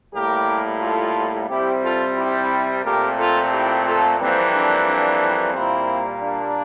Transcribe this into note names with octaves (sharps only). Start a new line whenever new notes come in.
A2 G3 A#3 G4 A#4
F4 A4
C3 G3 C4 E4 G4
F4 A4
E4 G4
A#2 A3 C4 G4 A#4
F4 A4
E4 G4
F4 A4
F2 E3 G3 A#3 C4
D4
D4
A#2 G3 A#3 C4 E4
D4